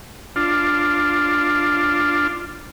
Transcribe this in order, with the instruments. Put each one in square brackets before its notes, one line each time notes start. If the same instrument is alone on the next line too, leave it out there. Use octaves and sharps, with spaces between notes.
[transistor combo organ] D4 F4